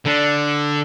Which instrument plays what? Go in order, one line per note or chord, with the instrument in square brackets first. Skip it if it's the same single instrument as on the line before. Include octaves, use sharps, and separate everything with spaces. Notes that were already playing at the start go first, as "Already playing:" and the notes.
[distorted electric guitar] D3